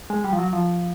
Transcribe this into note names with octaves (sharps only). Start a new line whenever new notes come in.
G#3
G3
F3
F#3
F3